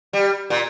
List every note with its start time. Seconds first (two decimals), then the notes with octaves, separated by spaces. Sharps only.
0.13 G3
0.50 A#2